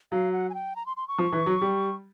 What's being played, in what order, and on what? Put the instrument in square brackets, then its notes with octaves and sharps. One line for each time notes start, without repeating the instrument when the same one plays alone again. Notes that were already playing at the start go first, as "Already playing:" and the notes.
[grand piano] F#3 [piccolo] F5
[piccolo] F#5
G#5
G5
A#5
C6
C6
C#6
[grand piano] F3
E3
F#3
G3